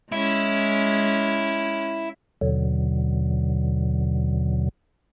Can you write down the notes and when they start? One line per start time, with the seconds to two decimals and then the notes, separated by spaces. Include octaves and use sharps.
0.12 G#3 C#4 E4
2.41 D#2 B2 D3 F#3